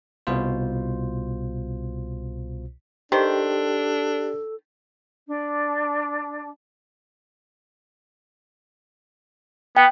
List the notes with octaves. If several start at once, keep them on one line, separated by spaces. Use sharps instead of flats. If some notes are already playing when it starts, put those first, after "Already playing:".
C2 B2 F4 C5
D#3 D4 G4 A4 C5
D4
B3 G5